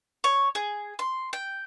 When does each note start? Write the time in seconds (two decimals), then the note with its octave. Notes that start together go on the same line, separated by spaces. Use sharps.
0.24 C#5
0.55 G#4
0.99 C6
1.33 G5